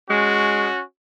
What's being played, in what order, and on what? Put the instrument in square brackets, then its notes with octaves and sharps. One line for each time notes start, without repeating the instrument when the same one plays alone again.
[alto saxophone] G#3 [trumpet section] C#4 F#4